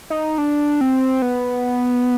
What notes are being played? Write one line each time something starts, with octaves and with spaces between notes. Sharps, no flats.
D#4
D4
C4
B3